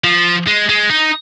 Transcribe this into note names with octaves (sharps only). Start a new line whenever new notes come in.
F3
G#3
G#3
D#4